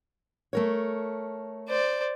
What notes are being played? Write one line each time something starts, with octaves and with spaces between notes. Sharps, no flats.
A3 A#4 C#5
C5 D5